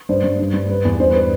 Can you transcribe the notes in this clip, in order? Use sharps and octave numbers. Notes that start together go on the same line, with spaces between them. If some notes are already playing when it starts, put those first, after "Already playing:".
G2 C5
G2
G2
G2
G3 B4
E2
G2 C5
B4
B4